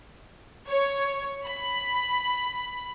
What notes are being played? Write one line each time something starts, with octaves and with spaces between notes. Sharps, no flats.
C#5
B5